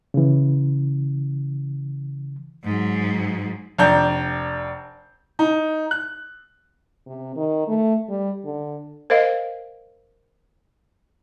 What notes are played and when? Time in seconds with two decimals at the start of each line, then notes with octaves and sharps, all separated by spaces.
0.14 C#3 E3
2.64 G#2 F#3
3.79 F1 D4 A#5 G6
5.39 D#4
5.91 F#6
7.06 C3
7.36 D#3
7.68 A3
8.09 G3
8.45 D3
9.10 A#4 C5 D#5 F5